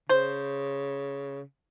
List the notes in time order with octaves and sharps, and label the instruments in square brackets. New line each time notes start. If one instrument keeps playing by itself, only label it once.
[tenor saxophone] C#3 [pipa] C5